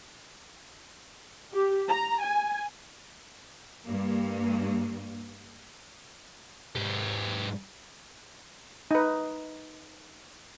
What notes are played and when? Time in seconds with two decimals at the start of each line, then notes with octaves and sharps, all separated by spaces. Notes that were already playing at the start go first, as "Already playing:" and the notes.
1.53 G4
1.88 A#5
2.22 G#5
3.84 G2 A#3
6.76 G#2 G4
8.91 D#4 B4